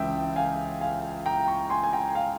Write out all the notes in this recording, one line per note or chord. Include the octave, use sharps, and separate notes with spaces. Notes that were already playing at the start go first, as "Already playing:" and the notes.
Already playing: C#2 C#3 E3 E5 G5
F5 G#5
F5 G#5
G5 A#5
A#5 C#6
G#5 C6
G#5
G5 A#5
F5 G#5